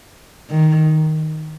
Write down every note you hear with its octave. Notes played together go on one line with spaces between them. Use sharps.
D#3